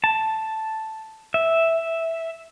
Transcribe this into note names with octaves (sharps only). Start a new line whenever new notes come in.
A5
E5